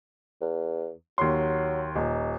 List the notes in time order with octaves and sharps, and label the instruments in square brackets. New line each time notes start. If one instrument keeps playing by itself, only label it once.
[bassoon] E2
[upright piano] D#2 C6 [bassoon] F#3
[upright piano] D#1 [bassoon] D#4